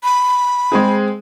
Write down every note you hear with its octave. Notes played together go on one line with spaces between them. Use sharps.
B5
G#3 C4 G#4